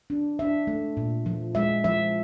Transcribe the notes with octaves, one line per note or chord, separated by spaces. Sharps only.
D4
D4 E5
A3
A#2
F3
G#3 E5
F3 E5